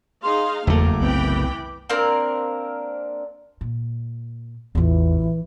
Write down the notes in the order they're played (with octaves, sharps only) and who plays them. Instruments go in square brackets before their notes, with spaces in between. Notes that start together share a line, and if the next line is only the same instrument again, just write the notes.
[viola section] D#4 G#4 F5 [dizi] C6
[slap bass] F#1 A3 [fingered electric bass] E2 [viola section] A#3 A4 A#4 [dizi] D6
[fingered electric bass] C2 B3 C4 [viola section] E3 G5 B5
[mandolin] A#3 C4 D4 A#4
[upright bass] A#2
[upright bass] A1 F4 [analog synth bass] E2 [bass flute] E3